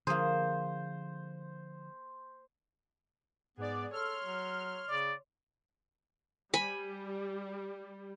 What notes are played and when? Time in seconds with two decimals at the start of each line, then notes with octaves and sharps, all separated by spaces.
0.07 D3 F3 A#3 G#4 C5
3.57 G#2 B3 G#4 D5
3.93 A4 C#5 C6 F6
4.24 F#3
4.88 C#3 D5
6.54 G3 G#5 B5